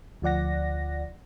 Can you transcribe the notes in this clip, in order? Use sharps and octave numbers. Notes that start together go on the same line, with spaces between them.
D2 F3 D5 F#5 A#6